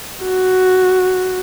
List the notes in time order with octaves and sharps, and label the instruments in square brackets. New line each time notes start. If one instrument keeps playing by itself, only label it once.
[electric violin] F#4